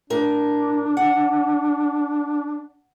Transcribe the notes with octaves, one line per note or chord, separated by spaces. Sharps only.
A2 D4 A#4
F#5